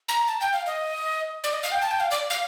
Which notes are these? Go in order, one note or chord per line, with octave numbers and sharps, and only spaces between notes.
A#5
A5
G5
F5
D#5
D5
D#5
F5
G5
A5
G5
F5
D5
F5